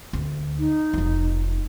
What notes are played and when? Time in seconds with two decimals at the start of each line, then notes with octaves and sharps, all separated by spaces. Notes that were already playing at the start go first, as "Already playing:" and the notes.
0.13 D2
0.59 D#4
0.93 F1 F3